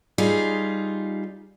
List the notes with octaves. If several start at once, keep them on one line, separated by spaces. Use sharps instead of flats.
G3 D#4 F4 G#4